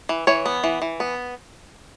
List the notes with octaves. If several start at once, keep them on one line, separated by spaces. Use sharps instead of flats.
E3
E3 C#5
B3
E3
E3
B3